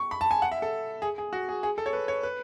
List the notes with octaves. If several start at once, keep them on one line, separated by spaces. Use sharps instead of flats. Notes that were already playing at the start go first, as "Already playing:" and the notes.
Already playing: C#6
B5
A5
G#5
F#5
E5
A4
G#4
G#4
F#4
G#4
G#4
A4
C#5
B4
C#5
B4